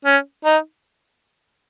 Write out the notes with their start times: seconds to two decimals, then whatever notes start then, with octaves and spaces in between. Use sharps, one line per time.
0.05 C#4
0.45 D#4